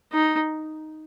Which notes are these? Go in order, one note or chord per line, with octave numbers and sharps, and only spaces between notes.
D#4